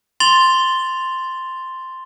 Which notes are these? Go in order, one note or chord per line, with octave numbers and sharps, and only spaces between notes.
C6 A6 F7 G7